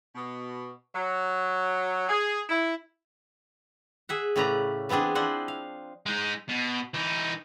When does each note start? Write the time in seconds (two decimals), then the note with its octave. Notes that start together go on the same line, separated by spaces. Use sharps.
0.14 B2
0.94 F#3
2.09 G#4
2.48 E4
4.09 G#4 E5 F#5
4.36 A2 C#3 C#4 B4 D5 A#5
4.89 E3 B3 C4 D4 G#4
5.15 F3 D4 E4 C5 F#5
5.48 F5
6.06 G#3 D#4
6.49 B2
6.94 E3 D#4